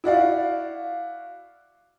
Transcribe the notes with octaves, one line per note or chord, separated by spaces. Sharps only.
E4 F#4 D5 F5